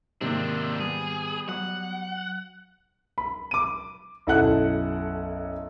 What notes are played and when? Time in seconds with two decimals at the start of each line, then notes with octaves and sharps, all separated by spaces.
0.21 G#2 C3 D#3 A#3 C4 D4
0.79 G3 B3 G#4
1.49 F#3 F#5
3.18 B5
3.51 D6 D#7
4.27 B1 F#2 E4 A4 F#5 F#6